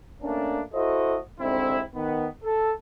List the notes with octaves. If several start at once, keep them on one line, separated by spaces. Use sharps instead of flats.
A3 A#3 C#4 D4
E4 F#4 A4 C5 D#5
C2 G#2 D3 C4 E4
D#3 B3
A4